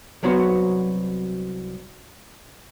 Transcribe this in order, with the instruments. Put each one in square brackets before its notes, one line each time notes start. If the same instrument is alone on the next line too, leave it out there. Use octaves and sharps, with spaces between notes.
[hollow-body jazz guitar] C2 F#3 B3 F#4 C5